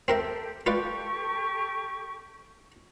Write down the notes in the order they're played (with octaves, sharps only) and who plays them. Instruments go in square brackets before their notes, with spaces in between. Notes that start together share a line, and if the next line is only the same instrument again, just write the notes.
[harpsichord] C4 A#4 E5 [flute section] G4 A4
[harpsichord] F4 B4 D5 [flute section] G4 A4 C#6